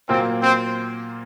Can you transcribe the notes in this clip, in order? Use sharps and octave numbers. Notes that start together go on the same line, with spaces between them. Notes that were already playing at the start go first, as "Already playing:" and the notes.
A#2 F#3 A#3 C4 F4 A#4
C4